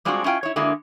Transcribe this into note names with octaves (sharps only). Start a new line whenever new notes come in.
G3 G#3 C4 D4 F4 F#4
C#4 E4 F4 G5
E4 C#5
D3 G#3 A#3 E4 F#4